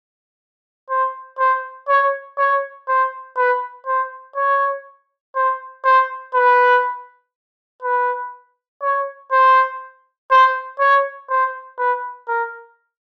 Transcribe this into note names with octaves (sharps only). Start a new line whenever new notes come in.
C5
C5
C#5
C#5
C5
B4
C5
C#5
C5
C5
B4
B4
C#5
C5
C5
C#5
C5
B4
A#4